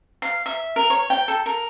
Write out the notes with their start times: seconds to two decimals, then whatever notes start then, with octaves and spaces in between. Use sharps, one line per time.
0.22 F5
0.46 E5
0.76 A#4
0.90 C#5
1.10 G5
1.28 A4
1.46 A#4